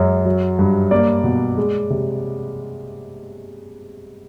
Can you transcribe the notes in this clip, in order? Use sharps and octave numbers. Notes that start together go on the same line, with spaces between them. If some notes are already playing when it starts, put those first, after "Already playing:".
Already playing: F#2 G#3
F#3
G2
A#3 D5
B2
G#3
C3